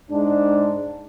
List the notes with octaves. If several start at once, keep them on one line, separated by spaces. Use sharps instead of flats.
G#2 G#3 D4